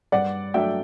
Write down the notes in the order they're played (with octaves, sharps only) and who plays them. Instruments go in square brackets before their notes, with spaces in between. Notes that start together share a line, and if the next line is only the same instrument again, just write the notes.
[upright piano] G2 D5 F#5
F#3 A3 D4 E5 G5